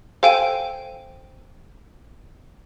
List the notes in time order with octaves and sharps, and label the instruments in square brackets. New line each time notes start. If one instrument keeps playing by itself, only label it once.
[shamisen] A4 F5 G#5 [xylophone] C5 G5 D#7